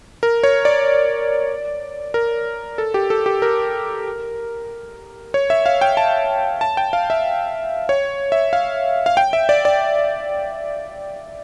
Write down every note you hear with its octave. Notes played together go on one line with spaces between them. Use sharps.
A#4
C#5
D5
A#4
A4
G4
A4
G4
A#4
C#5
E5
F5
G5
A5
A5
G5
F5
E5
C#5
E5
F5
F5
G5
E5
D5
D5